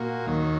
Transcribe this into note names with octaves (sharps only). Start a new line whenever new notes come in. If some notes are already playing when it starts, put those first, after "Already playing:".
Already playing: A#2 A#3 F#4
D#2 D#3 F#3